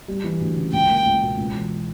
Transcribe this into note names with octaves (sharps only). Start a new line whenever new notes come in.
G3
E3
D2
C#3
C#2 G5
A#3
C#2
B2
C#2
E3